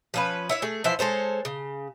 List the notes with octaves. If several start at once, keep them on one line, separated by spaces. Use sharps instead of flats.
F3 C#4 B4
E4 C#5 E5
A3 G#4
E3 F3 C5 E5
G#3 A4 C5 C#5
C#3